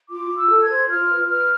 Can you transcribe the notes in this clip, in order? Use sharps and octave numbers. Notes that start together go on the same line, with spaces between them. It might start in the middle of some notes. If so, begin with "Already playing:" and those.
F4 D6
F4
E6
A4
G#6
C5
F4 F6
B4
B4 F6